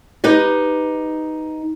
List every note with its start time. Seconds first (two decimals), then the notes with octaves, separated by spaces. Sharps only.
0.24 D#4 G4 B4 D#5